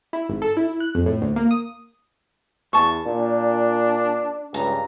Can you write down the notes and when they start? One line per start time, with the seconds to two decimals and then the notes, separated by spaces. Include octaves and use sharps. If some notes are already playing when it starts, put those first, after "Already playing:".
0.13 E4
0.29 G#1
0.42 A4
0.57 E4
0.80 F#6
0.95 F2
1.06 A2
1.22 D2
1.36 A#3
1.51 D#6
2.73 E2 A5 C#6
3.06 A#2 D4
4.54 C#2 G2 A#5